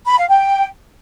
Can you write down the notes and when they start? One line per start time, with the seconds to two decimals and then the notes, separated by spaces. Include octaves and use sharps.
0.06 B5
0.17 F5
0.28 G5